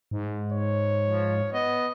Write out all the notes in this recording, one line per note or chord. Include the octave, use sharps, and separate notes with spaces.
G#2
C#5
F3
B3 D#5